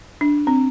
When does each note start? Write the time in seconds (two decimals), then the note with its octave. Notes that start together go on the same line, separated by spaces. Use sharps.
0.21 D4
0.47 C4